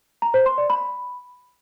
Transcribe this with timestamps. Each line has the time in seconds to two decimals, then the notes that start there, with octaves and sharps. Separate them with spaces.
0.22 A#5
0.34 C5
0.46 C6
0.58 D5
0.70 B5